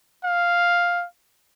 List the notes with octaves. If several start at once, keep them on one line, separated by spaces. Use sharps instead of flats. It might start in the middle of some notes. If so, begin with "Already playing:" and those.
F5